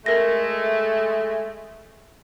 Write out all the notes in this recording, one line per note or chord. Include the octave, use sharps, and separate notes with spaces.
G#3 A3 A#4 A#6